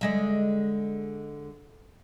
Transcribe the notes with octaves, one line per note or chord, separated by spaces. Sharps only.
D3 G#3 E5